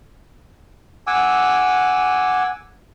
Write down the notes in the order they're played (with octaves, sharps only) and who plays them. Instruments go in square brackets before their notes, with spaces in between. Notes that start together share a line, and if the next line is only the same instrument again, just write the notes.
[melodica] F#5 G#5 D6 E6